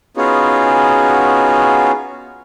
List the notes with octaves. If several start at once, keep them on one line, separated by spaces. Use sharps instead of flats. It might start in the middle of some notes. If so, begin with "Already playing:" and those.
B3 C#4 D#4 F4 F#4 G#4